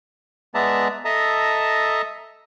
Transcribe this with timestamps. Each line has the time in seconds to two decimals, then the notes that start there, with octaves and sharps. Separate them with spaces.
0.55 G#3 B3 D5 E5 A5 A#5
1.05 A4 D#5 E5 A5 A#5